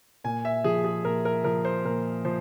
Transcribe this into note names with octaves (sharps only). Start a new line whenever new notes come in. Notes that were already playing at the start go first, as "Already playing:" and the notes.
A#2 G#5
E5
F3 G#4
G#4
A#2 A#4
A#4
F3 A#4
C5
A#2 A#4
F3 C5